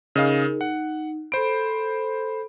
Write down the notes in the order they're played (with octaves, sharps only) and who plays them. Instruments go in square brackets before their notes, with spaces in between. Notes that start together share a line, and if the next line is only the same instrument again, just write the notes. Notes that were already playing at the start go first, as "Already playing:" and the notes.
[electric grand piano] C#3 D#5 F5 [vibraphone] D#4 G#4 A#4
[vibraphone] D#4 [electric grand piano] F#5
[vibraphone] A4 B5 [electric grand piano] C5 D7